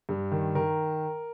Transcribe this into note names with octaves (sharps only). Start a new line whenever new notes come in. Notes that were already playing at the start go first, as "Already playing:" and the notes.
G2
D#3
D#3 A#4